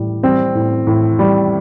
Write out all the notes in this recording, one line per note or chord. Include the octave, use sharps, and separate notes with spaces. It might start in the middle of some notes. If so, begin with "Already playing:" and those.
Already playing: A2 G3
G3 C4
A2
A2
G3